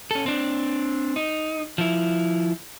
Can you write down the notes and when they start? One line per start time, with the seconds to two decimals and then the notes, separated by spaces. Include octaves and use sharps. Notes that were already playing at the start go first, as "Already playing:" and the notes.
0.11 C#4 A4
0.26 C4 D4
1.16 D#4
1.78 F3 E4